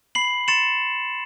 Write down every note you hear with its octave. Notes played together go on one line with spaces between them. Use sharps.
B5 C7 F#7
C6 A6 C#7 E7 F#7